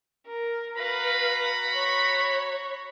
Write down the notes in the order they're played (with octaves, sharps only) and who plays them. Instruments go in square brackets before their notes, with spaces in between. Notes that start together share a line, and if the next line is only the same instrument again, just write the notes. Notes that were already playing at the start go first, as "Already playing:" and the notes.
[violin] A#4
[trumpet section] F#4 A#5 B5 [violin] B4 F5
[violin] C#5